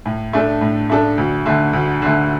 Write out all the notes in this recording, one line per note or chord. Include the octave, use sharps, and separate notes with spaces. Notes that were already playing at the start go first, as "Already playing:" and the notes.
A2
A3 D4 A4
A2
A3 D4 A4
D2
D3 A3
D2
D3 A3